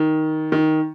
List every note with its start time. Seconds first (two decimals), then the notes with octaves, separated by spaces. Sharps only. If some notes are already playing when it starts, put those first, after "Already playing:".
Already playing: D#3
0.52 D#3